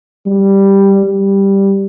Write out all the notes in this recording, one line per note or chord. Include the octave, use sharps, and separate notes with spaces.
G3
G3